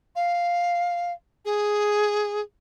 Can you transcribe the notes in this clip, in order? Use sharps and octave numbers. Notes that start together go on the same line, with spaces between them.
F5
G#4